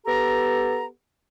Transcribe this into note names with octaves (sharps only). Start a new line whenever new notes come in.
B3 G4 A4 A#5